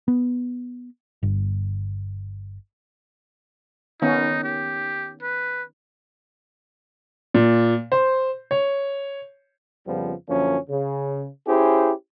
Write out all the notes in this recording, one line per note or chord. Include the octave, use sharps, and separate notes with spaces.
B3
G1
D#3 B3 C#4 D#4
G4
B4
A#2
C5
C#5
F2 C#3 F3 G3 B3
F#2 D3 F3 A#3 C#4
C#3
C#4 E4 G4 G#4 C5